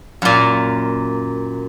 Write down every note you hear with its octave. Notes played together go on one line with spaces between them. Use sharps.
F#2 A#2